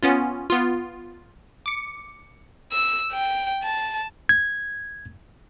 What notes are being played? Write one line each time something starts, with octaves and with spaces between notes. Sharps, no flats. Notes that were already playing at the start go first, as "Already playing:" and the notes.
B3 C#4 F4
B3 F4
D6 C#7
E6
G5
A5
G#6